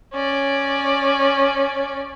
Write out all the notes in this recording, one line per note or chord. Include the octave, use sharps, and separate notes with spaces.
C#4 D5